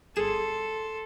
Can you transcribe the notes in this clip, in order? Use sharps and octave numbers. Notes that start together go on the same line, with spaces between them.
G1 G#4 A4 C6 E7